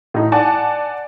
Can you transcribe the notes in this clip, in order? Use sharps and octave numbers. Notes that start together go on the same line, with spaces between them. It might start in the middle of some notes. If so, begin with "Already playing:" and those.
A2 D#4
D5 F#5 G#5 A5